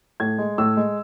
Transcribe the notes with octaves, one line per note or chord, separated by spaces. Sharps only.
A2 G#6
G#3
A2 E6
G#3